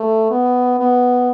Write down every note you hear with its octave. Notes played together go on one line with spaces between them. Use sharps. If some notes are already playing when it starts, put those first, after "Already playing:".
Already playing: A3
B3
B3